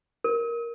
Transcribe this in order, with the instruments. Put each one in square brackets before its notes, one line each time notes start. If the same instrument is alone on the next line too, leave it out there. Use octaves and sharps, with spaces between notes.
[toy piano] A#4